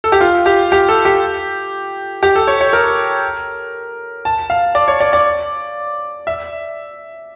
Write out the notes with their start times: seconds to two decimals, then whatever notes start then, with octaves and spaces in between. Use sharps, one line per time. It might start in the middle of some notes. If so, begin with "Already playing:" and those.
0.04 A4
0.12 G4
0.21 F4
0.46 G4
0.72 G4
0.89 A4
1.05 G4
2.23 G4
2.36 A4
2.47 C#5
2.61 C#5
2.73 A#4
4.25 A5
4.50 F5
4.75 D5
4.88 C#5
5.00 D5
5.13 D5
6.27 E5